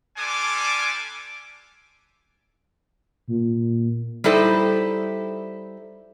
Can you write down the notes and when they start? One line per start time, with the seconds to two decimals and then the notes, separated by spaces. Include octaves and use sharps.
0.17 G3 D4 F4 A4 G#5 D6
3.28 A#2
4.24 G3 D#4 E4 A4 C5